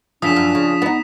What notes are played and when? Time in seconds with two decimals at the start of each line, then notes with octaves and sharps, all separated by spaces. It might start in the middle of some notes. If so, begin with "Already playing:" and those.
0.22 F#2 C#3 F3 D4 D#6 B6 E7
0.36 F#2
0.55 C#3
0.82 B3 D#4